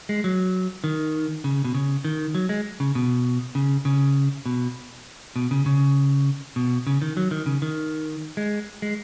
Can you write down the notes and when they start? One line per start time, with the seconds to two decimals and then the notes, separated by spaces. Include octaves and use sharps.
0.09 G#3
0.24 F#3
0.84 D#3
1.44 C#3
1.65 B2
1.75 C#3
2.05 D#3
2.35 F#3
2.49 G#3
2.80 C#3
2.95 B2
3.55 C#3
3.85 C#3
4.46 B2
5.36 B2
5.51 C#3
5.66 C#3
6.56 B2
6.87 C#3
7.02 D#3
7.17 F#3
7.31 D#3
7.46 C#3
7.62 D#3
8.37 G#3
8.82 G#3